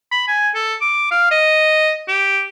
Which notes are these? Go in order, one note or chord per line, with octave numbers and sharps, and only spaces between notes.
B5
G#5
A4
D6
F5
D#5
G4